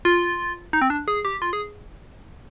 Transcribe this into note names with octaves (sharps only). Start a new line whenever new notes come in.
F4
D#4
C4
D4
G#4
G4
F4
G#4